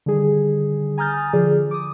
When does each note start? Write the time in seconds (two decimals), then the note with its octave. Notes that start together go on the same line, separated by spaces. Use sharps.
0.06 D3 D#3 G3 G#4
0.98 G#5 A#5 D#6 F6 G6 A6
1.33 D3 F3 G#4 D5
1.71 D6 D#6